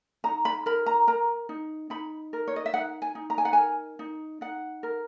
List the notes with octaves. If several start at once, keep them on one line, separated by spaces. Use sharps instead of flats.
D#4 A#5
B5
A#4 B5
A#5
A#4 A#5
D#4
D#4 B5
A#4
C#5
D#5
E5
D#4 F#5
G#5
D#4
A#5
G#5
F#5
A#4 G#5
D#4
D#4 F#5
A#4